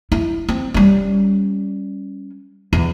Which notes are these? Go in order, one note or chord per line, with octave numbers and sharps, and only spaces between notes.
E4
C4
G3 C#4
E2